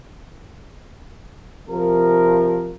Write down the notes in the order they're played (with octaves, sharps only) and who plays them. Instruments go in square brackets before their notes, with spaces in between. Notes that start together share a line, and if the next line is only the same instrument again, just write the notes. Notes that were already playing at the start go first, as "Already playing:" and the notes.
[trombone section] C3 F3 A#4